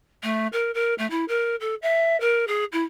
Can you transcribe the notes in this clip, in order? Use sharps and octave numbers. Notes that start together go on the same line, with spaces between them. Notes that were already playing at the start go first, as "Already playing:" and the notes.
A3
A#4
A#4
A3
E4
A#4
A4
E5
A#4
G#4
E4